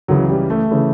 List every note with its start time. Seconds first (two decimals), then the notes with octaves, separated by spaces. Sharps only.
0.08 C#2 C#3 E3 F#3
0.30 G3
0.50 A3
0.71 C#3 E3